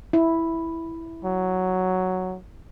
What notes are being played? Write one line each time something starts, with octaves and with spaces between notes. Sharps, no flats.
E4
F#3